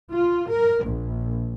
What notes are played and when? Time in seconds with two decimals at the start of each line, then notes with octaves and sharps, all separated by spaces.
0.12 F4
0.51 A#4
0.85 A#1